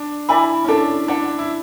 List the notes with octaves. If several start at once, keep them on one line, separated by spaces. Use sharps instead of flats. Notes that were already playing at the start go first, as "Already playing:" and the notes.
Already playing: D4
E4 D5 G#5 B5
C#4
D4 A4
D4 D5 F#5
E4